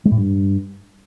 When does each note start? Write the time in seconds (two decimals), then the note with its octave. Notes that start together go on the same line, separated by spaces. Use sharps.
0.05 G#3
0.12 A2
0.18 G2